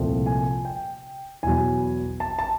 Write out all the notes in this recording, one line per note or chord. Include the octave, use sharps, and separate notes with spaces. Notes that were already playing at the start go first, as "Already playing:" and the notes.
Already playing: C2 A#2 F3 A3 C4
G#5
G5
E2 B2 F#3 G#5
A5
A5